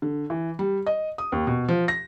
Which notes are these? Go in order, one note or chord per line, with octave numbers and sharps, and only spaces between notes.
D3
E3
G3
D#5
D#6
D#2
B2
F3
A#6